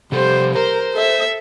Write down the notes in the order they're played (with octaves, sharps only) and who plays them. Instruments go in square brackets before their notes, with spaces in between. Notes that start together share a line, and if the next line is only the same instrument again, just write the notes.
[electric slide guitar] C3 A4 [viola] G3 C5
[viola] A#4 [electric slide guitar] C5
[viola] A4 E5